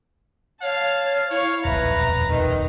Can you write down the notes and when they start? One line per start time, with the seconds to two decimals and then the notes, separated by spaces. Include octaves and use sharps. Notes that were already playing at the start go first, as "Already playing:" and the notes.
0.62 C#5 F5 A5
1.30 E4 C#5 F5
1.65 D#1 B1 F2 B4 E5 A#5
2.29 D#3 B4